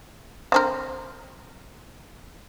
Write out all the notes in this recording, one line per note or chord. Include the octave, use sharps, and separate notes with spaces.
D3 C4 A#4